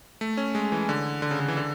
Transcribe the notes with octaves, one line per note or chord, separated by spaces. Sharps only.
A3
C#4
G#3
E3
D3
D3
C#3
D3
E3
D3